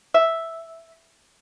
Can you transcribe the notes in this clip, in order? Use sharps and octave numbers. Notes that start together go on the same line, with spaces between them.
E5